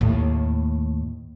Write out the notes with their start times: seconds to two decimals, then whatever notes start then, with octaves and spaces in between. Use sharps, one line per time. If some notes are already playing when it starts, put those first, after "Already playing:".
0.01 D#2 A2